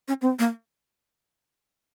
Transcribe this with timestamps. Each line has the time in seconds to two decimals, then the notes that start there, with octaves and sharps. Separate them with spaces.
0.08 C#4
0.22 C4
0.39 A#3